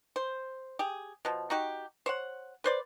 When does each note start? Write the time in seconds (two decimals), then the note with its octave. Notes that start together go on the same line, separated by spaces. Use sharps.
0.16 C5
0.79 G4 G#4
1.25 B2 F3
1.50 D#4 F#4 G4
2.06 C5 C#5 F#5
2.64 B4 C5 D5